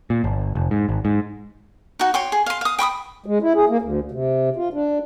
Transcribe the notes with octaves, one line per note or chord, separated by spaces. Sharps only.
A#2
G1
F1
G#2
G#1
G#2
D#4 F#4
C#5 G5 C6
G#4
F5 C6
F5 D#6
G5 B5 C#6 D#6
G#3
E4
G#4
A#3
D2
C3
F4
D4